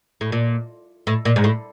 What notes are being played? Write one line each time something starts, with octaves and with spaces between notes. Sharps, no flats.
A2
A#2
A2
A#2
G#2
A2